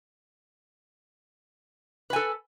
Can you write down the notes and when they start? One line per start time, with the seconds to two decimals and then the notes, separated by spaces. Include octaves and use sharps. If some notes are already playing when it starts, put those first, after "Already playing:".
2.10 B4
2.13 G#5
2.16 A4